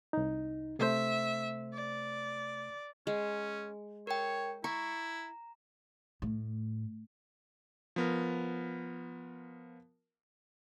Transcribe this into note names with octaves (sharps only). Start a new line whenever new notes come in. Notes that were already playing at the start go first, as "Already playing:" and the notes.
C2 D#4
C3 A3 C5 E5
D5
G#3 C#4
A#4 C#5 G5
E4 A#5 C#6
A2
F3 B3 A#4